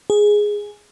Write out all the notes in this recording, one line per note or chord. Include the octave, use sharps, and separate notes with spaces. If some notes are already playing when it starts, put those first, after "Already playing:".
G#4